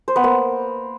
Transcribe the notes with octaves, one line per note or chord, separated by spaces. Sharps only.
C5
B3
A#3